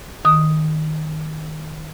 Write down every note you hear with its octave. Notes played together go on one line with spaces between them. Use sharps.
D#3 D#6